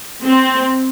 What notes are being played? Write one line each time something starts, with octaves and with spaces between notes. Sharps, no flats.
C4